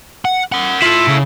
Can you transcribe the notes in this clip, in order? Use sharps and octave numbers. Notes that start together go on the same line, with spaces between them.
F#5
A#4 F#5
E4 F4 A4
C#3